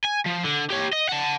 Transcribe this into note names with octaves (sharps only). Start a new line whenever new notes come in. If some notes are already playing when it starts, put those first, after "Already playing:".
G#5
F3
D3
G4 C#5
D#5
F#5 A5